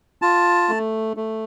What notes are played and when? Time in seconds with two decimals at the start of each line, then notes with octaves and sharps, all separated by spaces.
0.22 F4 A5
0.69 A3
1.17 A3